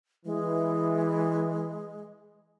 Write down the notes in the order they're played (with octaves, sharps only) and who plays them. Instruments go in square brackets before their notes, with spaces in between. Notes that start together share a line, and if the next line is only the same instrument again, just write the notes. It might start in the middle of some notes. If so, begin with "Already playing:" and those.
[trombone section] E3 [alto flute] G#3